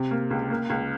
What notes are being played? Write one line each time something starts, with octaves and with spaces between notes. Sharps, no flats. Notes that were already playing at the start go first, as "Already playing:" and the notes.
Already playing: C3
A#3
C#2
A#3
C#2